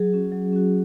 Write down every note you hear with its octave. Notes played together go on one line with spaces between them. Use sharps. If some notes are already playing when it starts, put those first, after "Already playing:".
Already playing: F#3 G#4
C#4 F#4
F#3
C#4 F#4